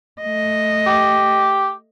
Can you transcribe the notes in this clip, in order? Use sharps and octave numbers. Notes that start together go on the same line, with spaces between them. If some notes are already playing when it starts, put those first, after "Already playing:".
A3 D#5
G4